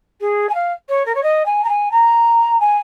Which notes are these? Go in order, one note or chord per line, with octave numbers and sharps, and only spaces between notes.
G#4
G#5
F5
C#5
A#4
C#5
D#5
G#5
A#5
G#5
A#5
G#5